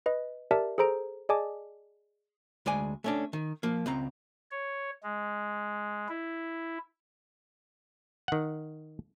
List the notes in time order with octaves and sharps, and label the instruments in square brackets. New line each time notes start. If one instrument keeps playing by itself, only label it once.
[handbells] B4 D#5
G4 A#4 D5 E5 A5
G#4 A4 C5 A#5 D7
G#4 D5 D#5 G#5 A5 D6
[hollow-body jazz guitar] D2 G#3 D5 G#5
A3 C#4 D4
D#3
F3 A#3
C#2 C4 A#5
[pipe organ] C#5
G#3
E4
[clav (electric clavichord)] D#3 F#5